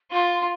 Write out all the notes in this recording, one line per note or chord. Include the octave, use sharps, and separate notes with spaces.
F4 C6